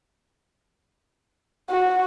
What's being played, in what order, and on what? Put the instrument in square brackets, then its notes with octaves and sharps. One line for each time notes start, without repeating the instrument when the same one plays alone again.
[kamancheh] F#4